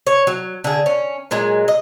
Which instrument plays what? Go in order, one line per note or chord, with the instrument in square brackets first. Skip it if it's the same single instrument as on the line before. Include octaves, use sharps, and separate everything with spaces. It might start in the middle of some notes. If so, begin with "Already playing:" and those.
[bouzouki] C#5
F#3
D3 G#4
C#4
A#2 F#3 G#3
D#5